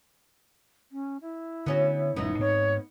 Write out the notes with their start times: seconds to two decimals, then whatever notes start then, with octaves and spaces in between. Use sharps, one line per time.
0.91 C#4
1.21 E4
1.66 D3 B3 C#4 F#4
2.16 D#1 G2 B3 C#4 D#4
2.39 G#2 C4 C#5